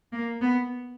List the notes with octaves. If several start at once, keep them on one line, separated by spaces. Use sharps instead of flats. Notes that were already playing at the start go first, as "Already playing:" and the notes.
A#3
B3